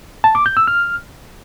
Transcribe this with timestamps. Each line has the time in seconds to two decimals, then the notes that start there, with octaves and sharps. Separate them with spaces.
0.24 A5
0.35 D6
0.46 G6
0.57 E6
0.67 F6